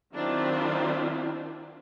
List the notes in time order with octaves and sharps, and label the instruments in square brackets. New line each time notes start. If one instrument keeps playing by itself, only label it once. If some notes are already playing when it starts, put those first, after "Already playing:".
[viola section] D#3 F#3 C4 D4 E4 F4